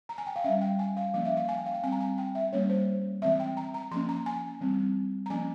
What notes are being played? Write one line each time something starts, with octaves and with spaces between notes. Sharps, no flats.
A#5
G#5
G5
F5
G3 C#4 E5
G5
G#5
F5
F3 A#3 C#4 F5
E5
F5
G#5
G5
F5
G5
G3 C4 G#5
A#5
G#5
G5
E5
G3 A#3 C#4 C#5
C5
E3 G#3 C4 E5
G5
A#5
A#5
F3 A#3 C#4 C6
A#5
G#5
E3 G3 C4
A#5
F3 A#3 C#4 G#5